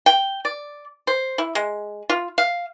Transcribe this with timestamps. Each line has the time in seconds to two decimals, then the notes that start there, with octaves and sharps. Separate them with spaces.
0.06 G5
0.45 D5
1.07 C5
1.38 E4
1.55 G#3
2.10 F4
2.38 F5